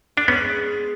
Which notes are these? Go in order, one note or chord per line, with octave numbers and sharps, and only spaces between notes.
A3 D4
G#3 B3 C#4